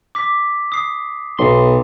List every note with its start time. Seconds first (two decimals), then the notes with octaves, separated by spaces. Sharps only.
0.15 D6 B6
0.72 D#6 C7
1.39 B1 B2 C6